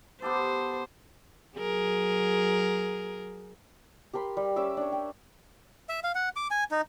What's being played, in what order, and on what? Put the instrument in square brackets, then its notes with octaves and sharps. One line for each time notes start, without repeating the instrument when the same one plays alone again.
[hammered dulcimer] B3 G4 A4 [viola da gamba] C5
[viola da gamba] F#3 G#4 A#4
[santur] G4 A#4 B5 C6
G3
C#4 E5 D6 E6
D4 C#5
G5
[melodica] E5
F5
F#5
D6
G#5
D#4